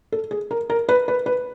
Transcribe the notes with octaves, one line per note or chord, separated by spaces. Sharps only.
A4
G#4
A#4
A#4
B4
B4
B4